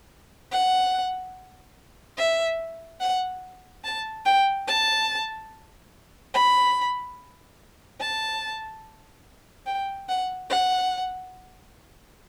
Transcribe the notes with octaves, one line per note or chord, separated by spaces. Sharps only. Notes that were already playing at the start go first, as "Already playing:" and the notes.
F#5
E5
F#5
A5
G5
A5
B5
A5
G5
F#5
F#5